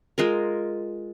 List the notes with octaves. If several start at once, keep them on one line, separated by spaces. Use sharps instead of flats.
G#3 F4 A#4